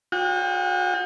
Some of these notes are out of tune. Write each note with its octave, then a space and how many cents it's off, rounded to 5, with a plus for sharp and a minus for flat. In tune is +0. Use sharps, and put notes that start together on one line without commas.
F#4 -35 G5 +30